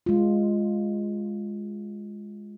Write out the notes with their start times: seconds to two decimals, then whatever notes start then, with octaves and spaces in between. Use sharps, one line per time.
0.06 G#3 F4